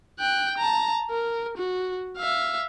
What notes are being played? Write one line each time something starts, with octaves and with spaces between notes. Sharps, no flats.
G5 F#6
A5 A#5
A#4
F#4
E5 F5